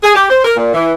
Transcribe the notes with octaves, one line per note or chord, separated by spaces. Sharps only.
G#4
G4
C5
A#4
A#2
E3